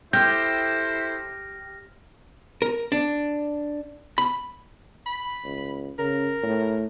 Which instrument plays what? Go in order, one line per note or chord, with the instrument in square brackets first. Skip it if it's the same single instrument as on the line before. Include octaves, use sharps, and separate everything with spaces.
[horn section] E4 A4 C5 [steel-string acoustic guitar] G4 [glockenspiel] F6 A#6 [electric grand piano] G6
[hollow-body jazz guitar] A#4
D4
B5
[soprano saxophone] B5
[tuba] C#2
[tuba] C#3 [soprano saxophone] A#4
[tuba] A2